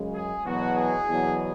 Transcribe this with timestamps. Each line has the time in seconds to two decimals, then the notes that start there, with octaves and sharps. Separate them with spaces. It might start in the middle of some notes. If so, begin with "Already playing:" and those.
Already playing: F#2 C#3 G#3
0.14 G#4
0.44 E2 B2 F#3 F#4
0.76 G#4
1.08 E2 B2 F#3